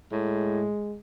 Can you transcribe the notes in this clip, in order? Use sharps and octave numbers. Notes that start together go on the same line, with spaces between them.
A2 G#3